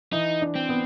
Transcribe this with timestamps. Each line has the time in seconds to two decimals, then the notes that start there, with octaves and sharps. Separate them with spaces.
0.13 E3 D#4
0.41 D4
0.56 C4
0.69 B3